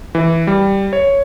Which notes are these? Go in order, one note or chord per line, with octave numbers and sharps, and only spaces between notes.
E3
G3
C#5